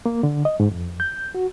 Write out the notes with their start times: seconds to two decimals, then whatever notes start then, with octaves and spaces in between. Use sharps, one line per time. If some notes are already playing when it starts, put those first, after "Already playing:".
0.06 A#3
0.23 D3
0.45 D#5
0.60 G#2
0.71 F2
1.00 G6
1.35 F#4